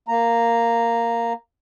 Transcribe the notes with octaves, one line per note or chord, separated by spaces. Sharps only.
A#3 A#5